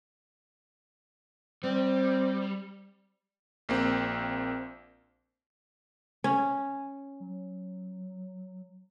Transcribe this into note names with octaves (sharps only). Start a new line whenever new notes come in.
G3 C4
A#1 A#3 C4
C#4 G#5
F#3